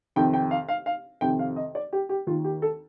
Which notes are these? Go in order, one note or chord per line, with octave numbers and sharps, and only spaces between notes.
F2 C3 D#3 G5
G5
F5
F5
F5
F2 C3 D#3 G5
F5
D#5
D5
G4
G4
D#2 D#3 F4
G4
A4